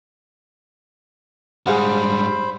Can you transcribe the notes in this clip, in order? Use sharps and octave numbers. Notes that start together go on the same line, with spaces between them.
G#2 G3 G#4 C5 F5 F#5 B5